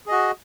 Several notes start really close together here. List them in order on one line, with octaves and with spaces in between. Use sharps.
G#4 D#5 F#4